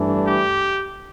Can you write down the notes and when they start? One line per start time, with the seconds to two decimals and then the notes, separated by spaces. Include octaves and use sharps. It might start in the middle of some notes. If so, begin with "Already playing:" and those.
Already playing: G2 E3 A3 D4
0.27 G4